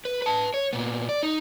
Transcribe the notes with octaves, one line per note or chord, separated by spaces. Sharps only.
B4
B4 A5
C#5
A#2 B3
D5
D#4